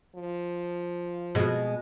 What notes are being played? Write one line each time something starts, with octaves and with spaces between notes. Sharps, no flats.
F3
B2 G#3